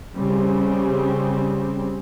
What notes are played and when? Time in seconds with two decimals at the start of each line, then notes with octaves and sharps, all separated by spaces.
0.15 C#3 G3 C4